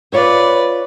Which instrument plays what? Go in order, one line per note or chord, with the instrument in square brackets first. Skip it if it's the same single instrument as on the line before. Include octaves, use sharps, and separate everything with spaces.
[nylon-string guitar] F4 C#5 E5 [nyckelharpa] B4 D5